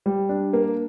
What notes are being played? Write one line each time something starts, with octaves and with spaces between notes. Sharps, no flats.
G3
D4
A#3